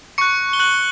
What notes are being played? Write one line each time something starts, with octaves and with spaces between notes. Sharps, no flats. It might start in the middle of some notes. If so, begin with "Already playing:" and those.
C#6 F#6 C#7
G7
F#6 F#7